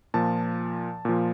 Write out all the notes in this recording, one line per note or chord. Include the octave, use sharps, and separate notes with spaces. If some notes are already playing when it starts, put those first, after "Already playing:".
A#2 F3 A5
A#2 F3